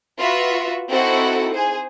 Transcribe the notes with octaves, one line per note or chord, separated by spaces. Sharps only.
F4 F#4 B4 E5
C4 D#4 E4 F#4 A4 F#5
G#4 C5